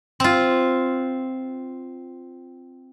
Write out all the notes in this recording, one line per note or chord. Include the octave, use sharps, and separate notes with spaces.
C4 F4